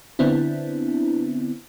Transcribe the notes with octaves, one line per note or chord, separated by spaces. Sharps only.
D3 B3 C4 D4 E4